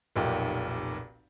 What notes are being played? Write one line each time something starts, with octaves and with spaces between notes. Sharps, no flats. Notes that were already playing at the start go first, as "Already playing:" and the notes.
F1 B1 A#2 G4